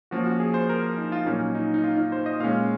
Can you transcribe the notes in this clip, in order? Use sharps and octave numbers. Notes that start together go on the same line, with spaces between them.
F3 A#3 C#4 F#4
F#4
G#4
C5
A#4
A#4
D#4
F4
A#2 F#3 A#3 C#4 D#4
D#4
D#4
F4
D#4
C5
D#5
A#2 G#3 C#4 F5